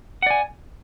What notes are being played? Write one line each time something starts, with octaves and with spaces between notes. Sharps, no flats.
D5 F#5 G#5